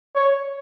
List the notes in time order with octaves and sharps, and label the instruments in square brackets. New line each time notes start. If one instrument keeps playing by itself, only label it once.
[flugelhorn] C#5